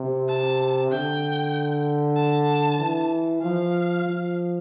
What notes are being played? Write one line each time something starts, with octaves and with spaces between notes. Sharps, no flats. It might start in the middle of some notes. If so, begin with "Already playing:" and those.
Already playing: C3
A5
D3 G5
A5
E3
F3 F5
F3